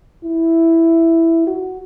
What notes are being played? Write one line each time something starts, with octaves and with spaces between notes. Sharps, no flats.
E4
F#4